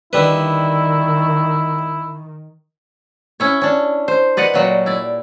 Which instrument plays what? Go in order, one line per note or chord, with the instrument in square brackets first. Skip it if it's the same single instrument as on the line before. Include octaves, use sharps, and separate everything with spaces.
[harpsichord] D3 G3 B4 [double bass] D#3 [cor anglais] E4
[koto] C#4 E4 C#5
C#4 D4
C5
B4 D5 D#5 F#5
A#2 F#3 G3
E4 D5